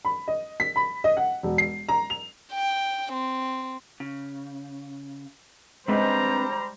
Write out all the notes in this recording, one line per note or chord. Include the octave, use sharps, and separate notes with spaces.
B5
D#5
B6
B5
D#5
F#5
E1
C7
A#5
F7
G5
C4
C#3
G3 G#3 C4 D4 B4 C5 A#5